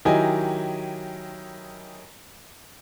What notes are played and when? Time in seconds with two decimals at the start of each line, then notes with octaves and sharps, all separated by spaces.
0.05 D#3 F#3 E4 G4 D#5 G#5